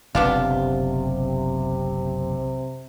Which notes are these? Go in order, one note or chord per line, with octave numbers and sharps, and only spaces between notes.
F#1 B1 C3 B3 D4 F4